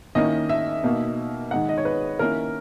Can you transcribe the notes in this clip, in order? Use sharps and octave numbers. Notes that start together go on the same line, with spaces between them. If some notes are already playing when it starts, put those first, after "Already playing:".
D#3 A#3 C#4 E4 D#5
E5
B2 A#3 D#4
D#3 G#3 D#4 F#5
D#5
C#5
B4
D#3 A#3 C#4 E4 A#4